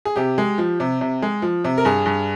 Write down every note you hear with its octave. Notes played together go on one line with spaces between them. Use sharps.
G#4
C3 G4
G#3
F3
C3
C3
G#3
F3
C3
A#4
G2 G#4
G2